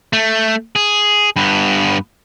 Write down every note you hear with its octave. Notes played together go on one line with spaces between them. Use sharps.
A3
G#4
G2 B3